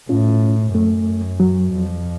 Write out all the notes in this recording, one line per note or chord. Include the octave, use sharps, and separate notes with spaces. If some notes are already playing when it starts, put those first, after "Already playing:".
A2 C#4 F4
F#2 A3
F#3
F2